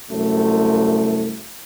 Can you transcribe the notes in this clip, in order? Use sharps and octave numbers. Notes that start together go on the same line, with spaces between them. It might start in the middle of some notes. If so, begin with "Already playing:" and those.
C2 F#2 C3 A3